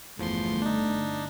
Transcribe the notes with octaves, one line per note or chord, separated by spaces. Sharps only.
G1 E2 D3 F3 A3 C6
D4 D#4